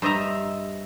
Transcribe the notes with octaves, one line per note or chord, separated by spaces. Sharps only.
G2 C5 D#5 E5 A#5